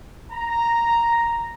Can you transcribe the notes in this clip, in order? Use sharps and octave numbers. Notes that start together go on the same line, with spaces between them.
A#5